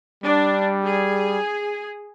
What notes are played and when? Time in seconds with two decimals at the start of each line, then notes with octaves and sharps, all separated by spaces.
0.24 G3 D4
0.85 G#4